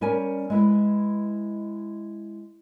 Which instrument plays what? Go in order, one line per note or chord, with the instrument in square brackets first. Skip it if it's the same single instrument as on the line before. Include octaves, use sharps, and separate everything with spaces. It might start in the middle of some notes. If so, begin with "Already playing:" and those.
[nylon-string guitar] G3 C#4 A#4 D5 G#5
G#3 E4 B4